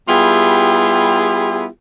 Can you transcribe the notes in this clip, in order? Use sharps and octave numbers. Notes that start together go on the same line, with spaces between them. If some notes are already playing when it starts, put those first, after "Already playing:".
G3 B3 E4 F4 G4 G#4